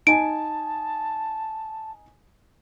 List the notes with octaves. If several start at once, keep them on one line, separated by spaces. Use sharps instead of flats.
D#4 G#5 A5 D7